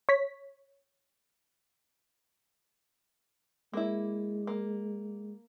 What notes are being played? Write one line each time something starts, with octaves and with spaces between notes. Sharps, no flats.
C#5 B6
G#3 A#3 E4
A#3